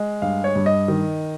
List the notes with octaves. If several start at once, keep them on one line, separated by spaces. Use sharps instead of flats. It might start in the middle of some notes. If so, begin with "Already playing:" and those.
Already playing: G#3
G2 F5
C#5
G2
D#5
D#3